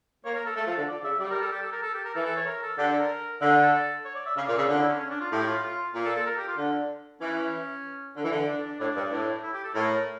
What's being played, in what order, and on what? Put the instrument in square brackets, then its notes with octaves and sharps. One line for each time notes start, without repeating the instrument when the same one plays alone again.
[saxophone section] A#3 [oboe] C#5
[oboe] A#4
A4
[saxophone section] A3 [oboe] A4
[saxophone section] F3 [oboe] A4
[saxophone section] D3
[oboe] D5
[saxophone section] C#3 [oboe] E5
[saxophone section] G3 [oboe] D5
[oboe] A#4
A4
G4
A4
A#4
A4
G4
A#4
[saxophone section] E3 [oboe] A4
[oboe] A4
C#5
A#4
A4
[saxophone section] D3 [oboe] G4
[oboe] A4
A#4
[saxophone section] D3 [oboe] E5
[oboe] A4
C#5
D5
E5
[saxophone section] C#3 [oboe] F5
[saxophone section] A#2 [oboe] D5
[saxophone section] C#3 [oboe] E5
[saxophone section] D3 [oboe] D5
[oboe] E4
C#4
C#4
D4
F4
[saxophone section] A2 [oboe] G4
[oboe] F4
F4
[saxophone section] A#2
[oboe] A4
A4
A#4
G4
F4
[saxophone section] D3
[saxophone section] E3 [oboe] C#4
[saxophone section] D3
E3
D3
[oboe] D4
D4
[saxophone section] A2 [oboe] D4
[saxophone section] G2
A2
[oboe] E4
G4
A4
[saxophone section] A2 [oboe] A#4
[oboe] A#4